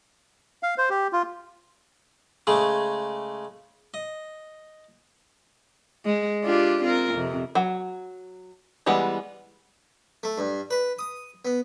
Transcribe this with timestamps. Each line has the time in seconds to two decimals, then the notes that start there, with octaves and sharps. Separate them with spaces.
0.63 F5
0.78 C5
0.90 G4
1.13 F4
2.47 C#3 G#3 A3 G#4
3.94 D#5
6.05 G#3
6.44 D4 F4 G4
6.83 C4 F4 A#4
7.14 F2 C3
7.55 F#3
8.86 E3 G3 G#3 B3
10.23 A3
10.38 G2
10.71 B4
10.99 D#6
11.45 B3